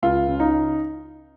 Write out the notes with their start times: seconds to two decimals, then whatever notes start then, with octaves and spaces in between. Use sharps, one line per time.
0.03 C#2 F4
0.28 C#3
0.40 D#4